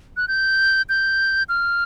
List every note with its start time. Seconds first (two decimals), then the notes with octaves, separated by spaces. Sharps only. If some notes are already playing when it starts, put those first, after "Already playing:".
0.17 F#6
0.28 G6
0.89 G6
1.49 F6